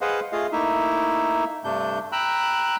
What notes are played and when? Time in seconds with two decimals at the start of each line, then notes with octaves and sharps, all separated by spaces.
0.01 G#4 B4 C5 D#5 F5 F#5
0.32 A3 F4 G#4 D#5 F5
0.52 A3 A#3 D#4 E4 E5
1.64 G2 C3 A3 D4 G6
2.12 G5 A#5 B5 E6 F#6